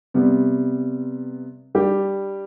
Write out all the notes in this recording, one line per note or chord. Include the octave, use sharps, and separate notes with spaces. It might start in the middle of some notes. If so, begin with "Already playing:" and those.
C3 G3 B3
G3 D4 G4